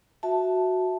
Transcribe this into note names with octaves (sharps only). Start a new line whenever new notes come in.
F#4 E5 A5